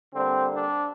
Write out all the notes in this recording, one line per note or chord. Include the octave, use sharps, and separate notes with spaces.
D3 G3 A#3 C4
D4